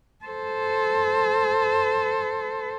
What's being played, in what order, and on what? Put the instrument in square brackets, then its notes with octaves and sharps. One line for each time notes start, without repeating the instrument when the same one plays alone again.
[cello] A4 C5